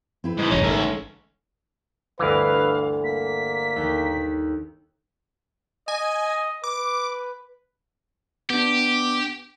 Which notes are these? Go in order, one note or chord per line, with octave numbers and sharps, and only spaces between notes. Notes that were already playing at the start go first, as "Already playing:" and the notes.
C4 E4 B4
G#2 E3 G#3
D1 F#2 C3 E3 C#4 D#4 C#5
A1 G#2 D3 A4 A#4 E5
C#4
G1 D2 E3 B4 F5
A#3 B6
D#2 G5
D#5 G#5
B4 D6
B3 D4 G4